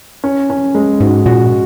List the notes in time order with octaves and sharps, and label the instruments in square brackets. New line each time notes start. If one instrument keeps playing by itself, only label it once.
[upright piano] C#4
C#4
G#3
[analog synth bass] G#2 [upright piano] F#4
[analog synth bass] A#2 [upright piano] F#4